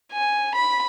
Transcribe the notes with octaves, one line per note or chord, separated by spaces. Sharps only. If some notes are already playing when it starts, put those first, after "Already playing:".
G#5
B5